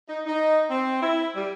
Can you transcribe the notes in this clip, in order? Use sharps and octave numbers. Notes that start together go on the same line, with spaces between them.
D#4
D#4
C4
E4
G3